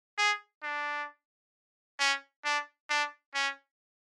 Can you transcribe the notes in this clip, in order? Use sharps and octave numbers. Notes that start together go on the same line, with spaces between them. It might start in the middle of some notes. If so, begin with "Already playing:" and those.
G#4
D4
C#4
D4
D4
C#4